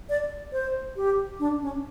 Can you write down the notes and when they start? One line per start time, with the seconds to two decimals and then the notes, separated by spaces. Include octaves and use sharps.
0.09 D5
0.52 C5
0.96 G4
1.39 D4
1.62 C#4